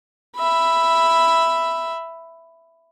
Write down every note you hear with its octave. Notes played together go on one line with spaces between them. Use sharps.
E5 B5